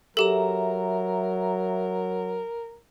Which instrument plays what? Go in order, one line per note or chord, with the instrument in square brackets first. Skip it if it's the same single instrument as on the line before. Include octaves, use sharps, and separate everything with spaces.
[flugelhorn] F#3 [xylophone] G4 A4 [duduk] A#4 [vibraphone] E5 A#5